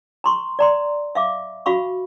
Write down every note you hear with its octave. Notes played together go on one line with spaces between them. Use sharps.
A#5 C6 C#6
D5 A#5 C6
E5 F5 D6
F#4 F5 B5 C#6